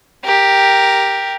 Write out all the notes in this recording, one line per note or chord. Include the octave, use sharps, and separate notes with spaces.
G4 A#4